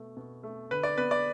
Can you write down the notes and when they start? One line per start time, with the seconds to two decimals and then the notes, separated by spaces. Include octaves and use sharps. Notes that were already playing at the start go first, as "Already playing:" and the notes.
Already playing: B2 A3
0.17 B2
0.43 A3
0.71 D3 B4
0.83 D5
0.98 B3 B4
1.11 D5